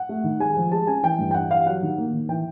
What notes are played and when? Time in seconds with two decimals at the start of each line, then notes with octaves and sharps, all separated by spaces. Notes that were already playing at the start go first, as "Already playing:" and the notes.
Already playing: F#5
0.09 A3
0.24 D#3
0.40 G#3 G#5
0.56 F3
0.72 G#3 A5
0.87 C#4 G#5
1.03 E3 G5
1.19 G2
1.31 G5
1.34 E3 F#5
1.51 G3 F5
1.66 F#3 F#5
1.83 D#3
1.98 A#3
2.13 D#3
2.29 E3 G5